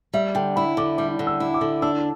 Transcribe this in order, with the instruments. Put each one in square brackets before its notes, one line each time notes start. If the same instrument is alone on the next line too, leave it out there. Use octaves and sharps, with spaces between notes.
[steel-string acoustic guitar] G3 [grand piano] E5
[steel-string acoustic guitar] D3 [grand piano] G5
[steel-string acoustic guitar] E4 [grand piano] B5
[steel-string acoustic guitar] D3 [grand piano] D6
[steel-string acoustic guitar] G3 [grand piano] D6
[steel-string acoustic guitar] D3
[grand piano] E6
[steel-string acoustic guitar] E4
[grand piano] D6
[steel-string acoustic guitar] D3
[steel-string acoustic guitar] D4 [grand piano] E6